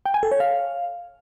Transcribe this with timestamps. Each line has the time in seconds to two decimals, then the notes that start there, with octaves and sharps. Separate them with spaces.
0.06 G5
0.14 G#5
0.23 A4
0.31 C#5
0.40 F5